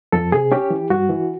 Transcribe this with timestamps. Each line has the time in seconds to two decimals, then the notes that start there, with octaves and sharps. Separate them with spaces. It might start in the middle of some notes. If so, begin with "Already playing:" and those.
0.12 F2 A4
0.32 C3 G#4
0.52 C#4 G4
0.70 E3
0.90 G2 F#4
1.09 E3